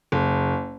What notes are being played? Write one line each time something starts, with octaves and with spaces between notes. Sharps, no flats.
F#1